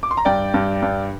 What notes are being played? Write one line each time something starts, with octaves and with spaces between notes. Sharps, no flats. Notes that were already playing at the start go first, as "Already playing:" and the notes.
D6
C6
A#5
G2 D5 G5
G2
G2